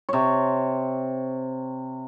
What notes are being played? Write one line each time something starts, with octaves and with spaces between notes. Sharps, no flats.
C3 C#5